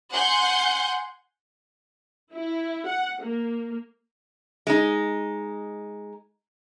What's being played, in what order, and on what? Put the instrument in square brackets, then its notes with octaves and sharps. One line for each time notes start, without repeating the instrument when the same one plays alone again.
[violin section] F#5 G#5 C6 G6
[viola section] E4
F#5
A#3
[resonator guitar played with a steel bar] G#3 D#4